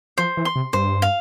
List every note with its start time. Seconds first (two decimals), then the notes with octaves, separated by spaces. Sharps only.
0.18 F3 C5
0.37 E3
0.45 C6
0.56 C3
0.73 G2 C5
1.02 F5